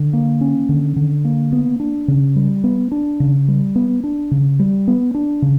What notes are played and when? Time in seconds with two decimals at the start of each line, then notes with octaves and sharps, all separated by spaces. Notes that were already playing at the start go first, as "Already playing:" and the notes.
Already playing: D3
0.13 A#3
0.41 C#4
0.69 D3
0.96 D3
1.25 A#3
1.53 B3
1.80 D4
2.08 C#3
2.36 G3
2.64 B3
2.92 D4
3.20 C#3
3.48 G3
3.76 B3
4.04 D4
4.31 C#3
4.59 G3
4.88 B3
5.14 D4
5.42 C#3